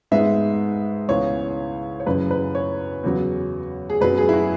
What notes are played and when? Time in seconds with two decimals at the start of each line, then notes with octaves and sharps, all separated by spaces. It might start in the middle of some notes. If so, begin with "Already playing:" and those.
0.11 G#2 G#3 B3 E5
1.09 C#2 C#3 E3 B3 C#5
2.00 C#5
2.07 F#2 C#3 E3 B4
2.31 B4
2.55 C#5
3.03 E2 C#3 F#3 B3
3.90 G#4
4.01 F#2 F#3 B3 B4
4.18 G#4
4.29 E4
4.33 F#4